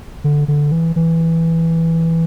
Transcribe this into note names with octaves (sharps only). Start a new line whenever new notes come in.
D3
D3
E3
E3